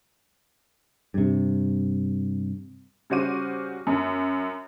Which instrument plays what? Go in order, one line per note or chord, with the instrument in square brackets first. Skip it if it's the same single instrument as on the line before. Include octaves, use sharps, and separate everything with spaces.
[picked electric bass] G2 C3
[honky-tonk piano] C#3 G3 F#4 C5 D6 D#7
F#2